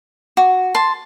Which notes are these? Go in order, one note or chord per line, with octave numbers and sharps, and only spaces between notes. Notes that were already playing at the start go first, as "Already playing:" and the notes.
F#4
A5 C6